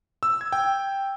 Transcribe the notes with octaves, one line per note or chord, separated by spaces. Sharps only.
E6
G#6
G5